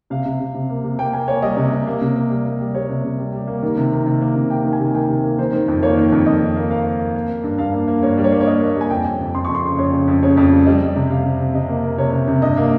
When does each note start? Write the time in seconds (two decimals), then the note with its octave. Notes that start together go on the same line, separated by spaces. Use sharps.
0.10 C3 F5
0.25 C3
0.40 C3
0.54 C3
0.69 A#3
0.84 C3
0.99 A#3 G5
1.13 A#3 G#5
1.28 A#3 C#5
1.42 G3 D#5
1.57 C3
1.72 C3
1.87 A#3
2.01 C3
2.16 A#3
2.30 G3
2.45 A#3
2.60 G3
2.74 G3 C#5
2.89 C3
3.04 C3
3.18 G3
3.33 G3
3.47 A#3
3.62 D#3
3.77 C3
3.92 D#3
4.06 C3
4.21 A#3
4.36 C3
4.50 A#3 G5
4.65 D#3
4.73 G#5
4.80 C3
4.94 D#3 G5
5.09 C3
5.24 A#3
5.39 D#3 C5
5.53 D#3
5.68 F2
5.82 A#3 C#5
5.97 D#3
6.12 F2
6.26 F2 D#5
6.41 D#3
6.56 A#3
6.70 A#3 F5
6.85 A#3
7.00 A#3
7.14 A#3 F5
7.29 A#3
7.44 G2
7.58 G2 F5
7.73 A#3
7.88 A#3
8.02 G2 C#5
8.17 G3
8.24 C#5
8.32 A#3
8.41 C#5
8.46 A#3 D#5
8.62 A#3
8.76 G3
8.81 G#5
8.90 F2 G5
9.05 F2
9.20 F2
9.35 F2 C6
9.45 F2 C#6
9.55 C6
9.64 C#3
9.78 F2 C#5
9.93 C#3
10.08 F2
10.23 C#3 C#5
10.37 F2
10.52 G3
10.66 G3 D#5
10.81 G3
10.96 C3
11.10 C3 F5
11.25 C3
11.40 C3
11.54 C3 D#5
11.69 A#3
11.84 A#3
11.98 C3 C#5
12.13 C3
12.28 C3
12.42 G2 D#5
12.57 A#3